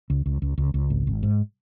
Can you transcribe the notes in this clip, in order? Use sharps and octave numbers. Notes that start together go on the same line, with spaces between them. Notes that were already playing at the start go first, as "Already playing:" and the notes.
C#2
C#2
C#2
C#2
C#2
G#1
G#1
G#2